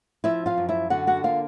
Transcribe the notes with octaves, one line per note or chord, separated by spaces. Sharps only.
F3 E4 E5
F4 F5
F#2
E4 E5
D3 F#4 F#5
F#4 F#5
A#3 F4 F5